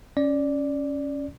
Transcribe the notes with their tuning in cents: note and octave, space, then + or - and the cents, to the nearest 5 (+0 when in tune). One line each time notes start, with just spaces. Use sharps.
C#4 +0 D5 +0